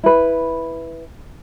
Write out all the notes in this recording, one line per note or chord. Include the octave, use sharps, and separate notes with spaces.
E4 B4